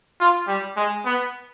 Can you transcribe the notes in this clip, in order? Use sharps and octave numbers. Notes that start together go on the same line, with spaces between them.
F4
G3
G#3
B3